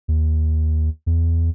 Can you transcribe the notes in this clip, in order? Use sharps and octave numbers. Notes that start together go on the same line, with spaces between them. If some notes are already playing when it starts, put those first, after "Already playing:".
D#2
E2